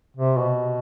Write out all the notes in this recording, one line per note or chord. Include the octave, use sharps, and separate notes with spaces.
C3
B2